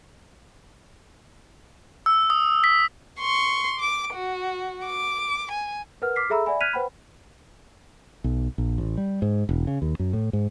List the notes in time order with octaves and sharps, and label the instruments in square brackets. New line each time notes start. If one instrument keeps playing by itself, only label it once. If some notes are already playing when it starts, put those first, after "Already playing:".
[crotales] E6
D#6
B6
[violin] C6 C#6
D6 D7
F#4
D6
G#5
[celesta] A#4 B4 F#5 F6
D6 F6 B6 C7
G#4 A4 E5 A#5 B5 E6
D5 E5 F#5 G#5 B5
F6 F#6 G#6 B6 D#7 F7
B4 C5 F#5 G5 B5
[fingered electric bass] B1
A#1
A1
G3
G#2
E1
C#3
D#2
F#2
A2
G#2